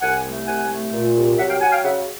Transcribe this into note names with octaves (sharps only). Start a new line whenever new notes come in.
C2 F#5 G#5
A3
C2 F#5 G#5
A3
A#2
C2
F#3 E5 F#5
F5 G5
F#3 F#5 G#5
F5 G5
C#3 E5 F#5